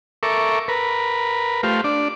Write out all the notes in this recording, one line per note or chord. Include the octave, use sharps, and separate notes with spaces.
A4 A#4 E5 C#6 D6
A#4 B4
A3 F4 G4 C5 F5
D4 D5